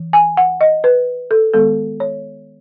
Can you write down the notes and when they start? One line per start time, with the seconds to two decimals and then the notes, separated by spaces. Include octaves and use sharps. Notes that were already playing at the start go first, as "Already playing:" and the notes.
Already playing: E3
0.13 G#5
0.37 F#5
0.61 D#5
0.84 B4
1.31 A4
1.54 D#3 G#3 B3 A4
2.00 C#5